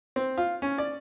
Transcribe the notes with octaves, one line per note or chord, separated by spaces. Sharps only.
C4
F4
C#4
D5